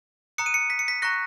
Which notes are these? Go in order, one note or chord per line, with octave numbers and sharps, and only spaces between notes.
A#5 D#6 F#6 C#7
D#7
C#7
B6
C#7
B6
A#5 C#6 F#6 A#6